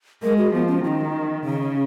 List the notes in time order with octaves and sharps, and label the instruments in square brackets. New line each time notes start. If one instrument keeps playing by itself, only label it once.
[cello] G#3 [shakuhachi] A#4
[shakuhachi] F#4
[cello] F3 [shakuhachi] B3
[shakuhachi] C#4
[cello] D#3 [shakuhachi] F4
[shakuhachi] D#4
[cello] C#3 [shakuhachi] C#4